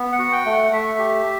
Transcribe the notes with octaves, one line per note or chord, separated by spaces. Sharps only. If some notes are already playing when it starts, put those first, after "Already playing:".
Already playing: B3
F#5
F#4
G5
A3
F#5
A3 E5
G4